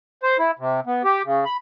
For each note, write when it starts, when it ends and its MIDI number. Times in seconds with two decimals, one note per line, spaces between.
0.23 0.37 72
0.39 0.51 64
0.59 0.80 48
0.86 1.03 59
1.04 1.22 67
1.25 1.45 49
1.45 1.57 83